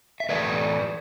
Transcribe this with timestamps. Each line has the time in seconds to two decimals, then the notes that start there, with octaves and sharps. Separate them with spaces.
0.20 E5
0.29 A2 E3 A3 B4 D5